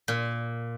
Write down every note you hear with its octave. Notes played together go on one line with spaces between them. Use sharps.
A#2